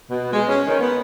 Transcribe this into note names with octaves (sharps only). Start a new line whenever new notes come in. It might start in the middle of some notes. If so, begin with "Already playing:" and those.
B2
G#3
C#4
D#3
B3